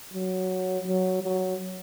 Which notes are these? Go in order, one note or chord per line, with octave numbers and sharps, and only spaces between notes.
F#3
F#3
F#3